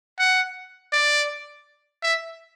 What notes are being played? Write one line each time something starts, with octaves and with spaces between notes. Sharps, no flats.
F#5
D5
E5